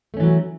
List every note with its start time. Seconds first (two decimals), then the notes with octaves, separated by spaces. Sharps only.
0.14 A3
0.17 C#4
0.20 E3
0.23 F#3